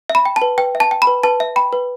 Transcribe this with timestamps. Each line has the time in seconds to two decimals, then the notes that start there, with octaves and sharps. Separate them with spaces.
0.10 E5
0.15 B5
0.25 G5
0.36 A5
0.42 B4
0.58 B4 G5
0.75 E5
0.80 A5
0.91 G5
1.02 B5
1.07 B4
1.23 B4 A5
1.40 E5
1.56 G5 B5
1.73 B4